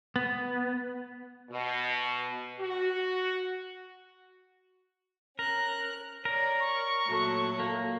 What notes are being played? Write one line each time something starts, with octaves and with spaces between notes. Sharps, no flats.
B3
B2
F#4
C#4 A#4 F#6
A#4 C#5 D5
C#6
A#2 F#3 A3
A#3